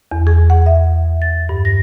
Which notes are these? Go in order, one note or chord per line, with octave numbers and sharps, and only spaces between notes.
E2
G#4
F#5
E5
A6
G2
A#6